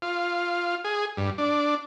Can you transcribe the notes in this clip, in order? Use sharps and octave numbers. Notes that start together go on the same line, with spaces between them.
F4
G#4
G2
D4